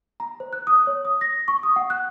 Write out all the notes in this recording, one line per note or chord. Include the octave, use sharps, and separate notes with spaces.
A#5
C5
F#6
D#6
C#5
D#6
A#6
C#6
D#6
F#5
F#6